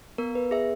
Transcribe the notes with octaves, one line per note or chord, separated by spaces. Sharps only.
B3 A#4
B4
G#4 E5